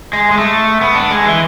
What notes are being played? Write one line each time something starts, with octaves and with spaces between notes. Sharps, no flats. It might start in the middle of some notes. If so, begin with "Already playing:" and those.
G#3
G#3
A3
B3
D4
G#3
E3